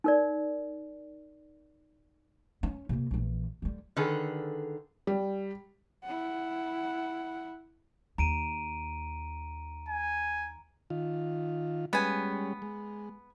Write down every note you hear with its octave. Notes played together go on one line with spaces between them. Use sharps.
D#4 A#4 D5
C#4
C3 A#3
A#1 E3
D3 G3
D3 D#3 G#4 A4 B4
G3
E4 F#5
D#2 A#5 D7 D#7
G#5
D#3 F4
G3 G#3 B3 C#4 G#5
G#3